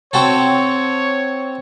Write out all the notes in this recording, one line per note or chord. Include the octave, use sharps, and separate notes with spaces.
C4 F#4 A4 C#5